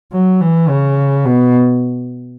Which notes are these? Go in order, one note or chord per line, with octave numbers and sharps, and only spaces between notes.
F#3
E3
C#3
B2